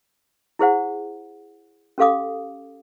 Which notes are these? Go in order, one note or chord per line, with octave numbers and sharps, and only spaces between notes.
E4 G#4 C5 F#5
C#4 G4 A4 F5 D6 D#6